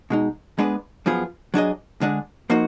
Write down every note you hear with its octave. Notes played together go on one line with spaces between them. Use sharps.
B2 G#3 D#4
G#3 B3 D4 G#4 B4
F#2 F3 B3 F4 G#4
F#3 D4 G#4 D#5
D3 G#3 D4 G#4
F3 A#3 D#4 F#4